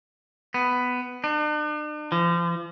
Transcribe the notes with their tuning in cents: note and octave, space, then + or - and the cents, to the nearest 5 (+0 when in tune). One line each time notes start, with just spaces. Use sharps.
B3 +10
D4 +45
F3 -40